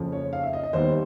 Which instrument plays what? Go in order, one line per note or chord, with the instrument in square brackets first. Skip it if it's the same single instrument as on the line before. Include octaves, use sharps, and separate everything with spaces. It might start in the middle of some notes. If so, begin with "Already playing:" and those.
Already playing: [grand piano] F#1 F2 C#3 F3
C#5
F5
E5
D#5
D#5
D#2 D#3 G3 B3 C5